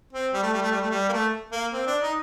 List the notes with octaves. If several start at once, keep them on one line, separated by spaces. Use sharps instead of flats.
C4
G3
A3
G3
A3
G3
A3
G3
A#3
A3
A#3
C4
D4
D#4